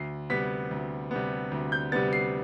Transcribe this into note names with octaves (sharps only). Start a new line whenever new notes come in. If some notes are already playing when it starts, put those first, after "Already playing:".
Already playing: D2 C7
C3 G3 B3 B6
D2
C3 G3 B3
D2
G6
C3 G3 B3 A6
C7